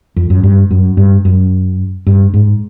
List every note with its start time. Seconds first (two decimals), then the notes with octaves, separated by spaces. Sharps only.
0.16 F2
0.30 F#2
0.43 G2
0.71 F#2
0.97 G2
1.25 F#2
2.07 G2
2.34 G#2